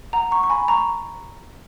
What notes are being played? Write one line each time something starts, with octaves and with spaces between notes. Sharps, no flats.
F#5 A#5
A#5 C#6
C#6
G#5 B5
A#5 C#6